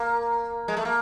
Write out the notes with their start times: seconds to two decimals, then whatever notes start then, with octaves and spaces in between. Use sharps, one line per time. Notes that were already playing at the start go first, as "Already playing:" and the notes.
Already playing: A#3
0.68 G#3
0.77 A3
0.85 A#3